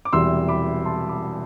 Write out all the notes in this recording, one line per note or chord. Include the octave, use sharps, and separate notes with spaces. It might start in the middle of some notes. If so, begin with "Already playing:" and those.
D6
E1 E2 C3 E3 G3 C6 E6
B5 D6
A5 C6
B5 D6